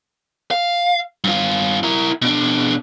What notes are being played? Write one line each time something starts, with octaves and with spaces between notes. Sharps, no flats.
F5
G2 F4
E4 A#4
B2 D4